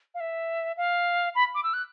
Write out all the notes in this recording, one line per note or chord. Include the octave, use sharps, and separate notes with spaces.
F5
E5
F5
B5
D6
E6
F#6